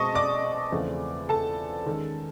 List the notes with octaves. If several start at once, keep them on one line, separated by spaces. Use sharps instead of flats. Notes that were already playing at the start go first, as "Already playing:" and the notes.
Already playing: B2 G#3 C4 D#5 A5 C#6 D#6
D5 D6
E2 C#3 F3 A3 C4
A4 A5
D#3 G#3 C#4